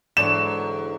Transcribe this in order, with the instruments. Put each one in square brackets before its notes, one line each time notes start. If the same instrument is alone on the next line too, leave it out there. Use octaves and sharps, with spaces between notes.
[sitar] E2 F#3 [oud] G#2 D3 [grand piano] D4 [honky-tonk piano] E7